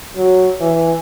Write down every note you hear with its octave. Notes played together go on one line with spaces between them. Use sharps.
F#3
E3